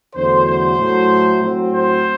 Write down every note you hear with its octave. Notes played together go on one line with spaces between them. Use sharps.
E2 D3 F#3 A3 C5
C5
A2 F#3 A3
A2 F#3 C4
C5